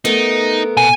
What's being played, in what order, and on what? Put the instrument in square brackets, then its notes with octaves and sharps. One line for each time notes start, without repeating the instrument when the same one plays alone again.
[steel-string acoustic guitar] A3 B3 A#4 [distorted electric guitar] D#4
[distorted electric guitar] B2 [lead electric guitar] G#5